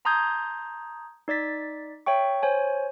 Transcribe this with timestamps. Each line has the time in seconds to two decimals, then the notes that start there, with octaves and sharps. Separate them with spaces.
0.05 A5 A#5 C6 D#6 G6 G#6
1.28 D#4 D5 A6 B6
2.06 C#5 E5 G5 C#6
2.43 C5 C#5 G#5